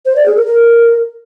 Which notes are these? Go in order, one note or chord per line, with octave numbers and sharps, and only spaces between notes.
C5
D5
G#4
A#4
A#4